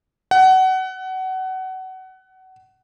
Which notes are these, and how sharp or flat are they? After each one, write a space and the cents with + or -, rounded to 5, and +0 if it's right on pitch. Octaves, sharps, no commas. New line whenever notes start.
F#5 +25